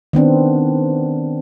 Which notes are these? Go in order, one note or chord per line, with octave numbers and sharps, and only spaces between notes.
D#3 B3 C4 D4